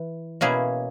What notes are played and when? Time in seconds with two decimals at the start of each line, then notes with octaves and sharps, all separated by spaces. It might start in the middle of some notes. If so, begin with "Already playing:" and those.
Already playing: E3
0.41 B2 A#3 C#4 E4 G#4